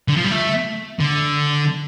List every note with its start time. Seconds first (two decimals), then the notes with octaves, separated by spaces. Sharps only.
0.08 D3
0.17 F3
0.24 G3
0.31 A3
1.00 D3